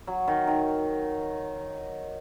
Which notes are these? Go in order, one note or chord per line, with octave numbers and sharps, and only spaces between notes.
F#3
D#3
D#3